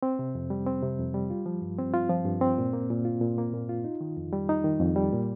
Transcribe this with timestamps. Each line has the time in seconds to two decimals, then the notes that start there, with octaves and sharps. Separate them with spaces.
0.03 C4
0.19 C3
0.35 F2
0.50 G3
0.66 C4
0.83 C3
0.99 F2
1.14 G3
1.30 F4
1.46 F3
1.62 G2
1.78 C4
1.94 F4
2.09 F3
2.26 G2
2.41 C4
2.58 A#2
2.73 A#3
2.90 A#2
3.05 F4
3.21 A#2
3.38 A#3
3.53 A#2
3.69 F4
3.84 D#4
4.01 D#3
4.17 F2
4.33 G3
4.49 D#4
4.64 D#3
4.80 F2
4.96 G3
5.13 A#2